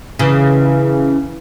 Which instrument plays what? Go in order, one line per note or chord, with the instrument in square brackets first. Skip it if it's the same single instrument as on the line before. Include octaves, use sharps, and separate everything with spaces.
[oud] C#3 E3